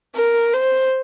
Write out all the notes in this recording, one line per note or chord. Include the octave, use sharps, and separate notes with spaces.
A#4
C5